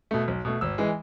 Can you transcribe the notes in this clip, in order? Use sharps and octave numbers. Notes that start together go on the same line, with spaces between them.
B2 A3
B1
B2 A3
G#1 E6
E3 G#3